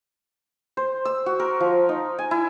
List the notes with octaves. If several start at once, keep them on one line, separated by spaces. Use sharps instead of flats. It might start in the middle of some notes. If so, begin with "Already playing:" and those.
C5
E6
F#4
A#4
F3
D#4
G#5
E4